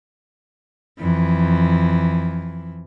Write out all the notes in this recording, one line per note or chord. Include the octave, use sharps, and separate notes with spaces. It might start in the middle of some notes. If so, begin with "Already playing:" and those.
F2 E3